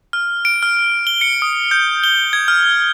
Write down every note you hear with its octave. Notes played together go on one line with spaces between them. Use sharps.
F6
D7
F6
G7
C#7
D#6
G6
G7
G#6
F6